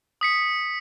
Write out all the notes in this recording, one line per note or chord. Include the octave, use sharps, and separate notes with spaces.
D#6 B6 C#7